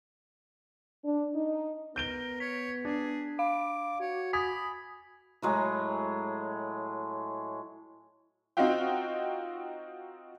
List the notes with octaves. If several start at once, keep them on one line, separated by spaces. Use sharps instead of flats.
D4
D#4
B3 A#4 G6 D7 G7
C#5 B6
D4 G#4
F5 D6
F#4 C#5
G#5 B5 D#6 G#6 B6
A2 F#3 G#3
C4 D#4 F4 F#4 F5 G5